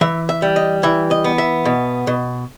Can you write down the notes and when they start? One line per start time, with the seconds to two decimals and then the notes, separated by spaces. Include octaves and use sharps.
0.01 E3 E5
0.29 E5
0.42 G3
0.56 D#5
0.83 E3 E5
1.11 D#5
1.24 B3
1.38 E5
1.65 B2
2.07 B2